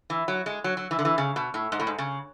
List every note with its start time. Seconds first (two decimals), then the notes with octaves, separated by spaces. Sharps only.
0.10 E3
0.28 F#3
0.46 G#3
0.64 F#3
0.77 F#3
0.91 E3
0.99 D3
1.05 E3
1.18 C#3
1.36 B2
1.54 A2
1.72 G#2
1.80 A2
1.87 G#2
1.98 C#3